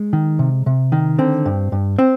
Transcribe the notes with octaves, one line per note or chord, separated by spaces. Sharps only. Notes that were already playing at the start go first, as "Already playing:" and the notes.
Already playing: G#3
D#3
C3
C3
D#3
D3 C4
G2
G2
C4